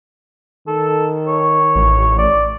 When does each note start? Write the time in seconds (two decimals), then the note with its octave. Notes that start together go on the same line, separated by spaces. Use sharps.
0.68 D#3 A4
1.28 C#5
1.75 A1
2.18 D5